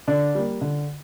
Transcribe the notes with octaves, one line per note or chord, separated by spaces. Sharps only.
D3 D4
G3 A#3
D3